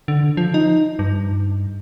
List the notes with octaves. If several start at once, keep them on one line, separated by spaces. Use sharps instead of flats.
D3
F3
D#4
G2